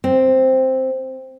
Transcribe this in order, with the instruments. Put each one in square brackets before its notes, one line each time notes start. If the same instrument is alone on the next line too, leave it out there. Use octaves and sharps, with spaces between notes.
[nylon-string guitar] C4